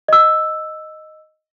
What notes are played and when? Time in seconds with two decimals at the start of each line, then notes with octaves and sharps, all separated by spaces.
0.08 D#5 E6